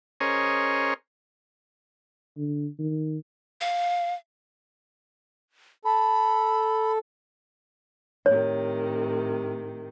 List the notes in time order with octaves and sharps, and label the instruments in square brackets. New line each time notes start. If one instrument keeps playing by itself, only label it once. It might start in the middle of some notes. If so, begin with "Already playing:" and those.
[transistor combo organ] C#4 G#4 A#4 C5 C#5 D#5
[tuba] D3
D#3
[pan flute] F5
[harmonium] A4 [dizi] B5
[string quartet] A2 C3 D#3 [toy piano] C#5